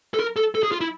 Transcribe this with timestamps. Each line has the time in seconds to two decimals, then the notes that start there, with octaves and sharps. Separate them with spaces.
0.14 A4
0.20 A#4
0.36 A4
0.55 A4
0.63 G#4
0.71 F4
0.81 E4